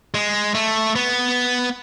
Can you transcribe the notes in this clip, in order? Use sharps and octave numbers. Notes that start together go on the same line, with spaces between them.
G#3
A3
B3